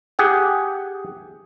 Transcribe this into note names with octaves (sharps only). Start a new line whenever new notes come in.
G4 G#4 F#5